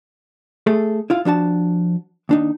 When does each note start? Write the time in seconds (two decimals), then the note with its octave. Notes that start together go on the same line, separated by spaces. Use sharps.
0.67 A3 G#4 A4
1.10 E4 F4 F5
1.25 F3 D4 F#4 A5
2.29 D#2 D4 D#4